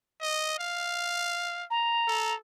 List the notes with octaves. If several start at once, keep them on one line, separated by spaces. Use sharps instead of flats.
D#5
F5
A#5
A4